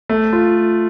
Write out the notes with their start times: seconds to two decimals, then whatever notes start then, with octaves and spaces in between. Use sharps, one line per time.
0.09 A3
0.33 F4